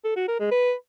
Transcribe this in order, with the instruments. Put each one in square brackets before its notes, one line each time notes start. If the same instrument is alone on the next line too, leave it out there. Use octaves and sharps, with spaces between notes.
[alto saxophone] A4
F#4
A#4
G#3
B4